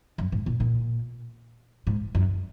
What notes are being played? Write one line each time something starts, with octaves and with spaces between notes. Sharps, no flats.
F#2
G#2
A#2
A#2
G#2
F#2